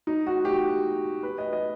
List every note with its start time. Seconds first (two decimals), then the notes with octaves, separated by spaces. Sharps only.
0.07 D#4
0.27 F#4
0.45 G4
1.23 B4
1.38 D#5
1.53 D#5